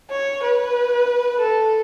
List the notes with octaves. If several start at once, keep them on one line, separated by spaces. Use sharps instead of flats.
C#5
B4
A4